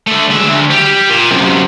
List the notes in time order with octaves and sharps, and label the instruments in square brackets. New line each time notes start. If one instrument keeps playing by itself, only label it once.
[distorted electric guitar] D3 A3
G#3 E5
D2
G3
A#2
F#2 C3